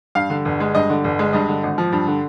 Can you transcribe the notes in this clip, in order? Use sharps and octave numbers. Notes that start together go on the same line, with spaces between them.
G2 F5
D3
G1
G#3
G2 D#5
D3
G1
G#3
G2 D#5
D3
G#1
F3
G2
D3